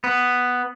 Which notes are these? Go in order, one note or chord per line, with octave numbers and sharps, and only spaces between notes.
B3